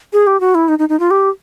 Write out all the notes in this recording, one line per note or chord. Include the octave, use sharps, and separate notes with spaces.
G#4
G4
F#4
E4
D#4
D#4
D#4
F4
G4